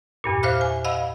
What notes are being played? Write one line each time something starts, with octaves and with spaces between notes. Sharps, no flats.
E2 G2 A#2
C5 E5 F5 D6 F6 F#6
G#5
D#5 F5 F#5 B5 E6